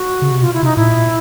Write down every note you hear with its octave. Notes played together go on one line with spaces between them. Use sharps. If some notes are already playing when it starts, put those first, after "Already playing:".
Already playing: F#4
C#3
C3
B2 F4
E4
C3 D#4
A2 E4
A#2